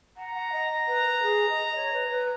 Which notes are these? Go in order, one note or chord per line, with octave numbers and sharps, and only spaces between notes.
F#5 A#5
F#5
D#5
B4
B4
G#4
D#5
C#5
B4
B4